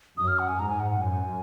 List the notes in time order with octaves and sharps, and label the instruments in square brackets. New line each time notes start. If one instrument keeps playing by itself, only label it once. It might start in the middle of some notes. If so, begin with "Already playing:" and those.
[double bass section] F#2 [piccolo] D#6
[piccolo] F6
F#5
G#5
[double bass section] G#2 [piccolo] A#5
[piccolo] G#5
F#5
F#5
[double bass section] F#2 [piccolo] G#5